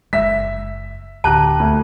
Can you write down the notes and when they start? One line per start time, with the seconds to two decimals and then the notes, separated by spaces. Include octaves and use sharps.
0.13 F#1 E2 G#3 E5 B6
1.24 D1 D3 G4 A5 A#5 F#6
1.60 D2